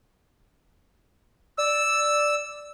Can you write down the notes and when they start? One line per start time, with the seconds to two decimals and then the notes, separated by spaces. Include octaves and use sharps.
1.58 D5 E6